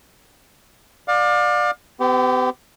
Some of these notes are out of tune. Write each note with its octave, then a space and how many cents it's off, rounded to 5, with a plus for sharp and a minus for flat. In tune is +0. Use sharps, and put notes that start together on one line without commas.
D5 +20 F5 +35
B3 +40 G4 -10